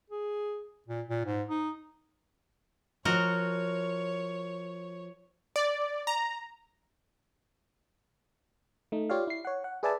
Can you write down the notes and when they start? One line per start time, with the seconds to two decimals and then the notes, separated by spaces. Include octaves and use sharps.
0.10 G#4
0.88 A#2
1.09 A#2
1.25 G#2
1.49 D#4
3.05 F3 F#4 A#4 C#5 D#5
5.56 D5
6.07 A#5
8.92 A3 D#4
9.10 F4 G4 C#5 D5 F5
9.27 E4 C7
9.45 C#5 F#5
9.64 F#5
9.83 G#4 B4 D5 E5 G#5 A5